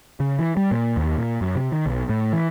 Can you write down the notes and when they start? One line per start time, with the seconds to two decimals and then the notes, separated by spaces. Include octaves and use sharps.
0.20 C#3
0.39 E3
0.57 G3
0.71 A#2
0.97 D#2
1.18 A#2
1.41 F#2
1.55 C3
1.72 D#3
1.86 B1
2.09 A2
2.33 E3